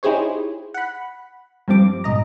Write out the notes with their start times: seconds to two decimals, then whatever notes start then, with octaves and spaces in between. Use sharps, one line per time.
0.03 D#4 E4 G4 G#4 C5 C#5
0.74 F#5 B5
1.68 G2 F3 G3 C4 D6
2.04 G#2 B2 D#5 A#5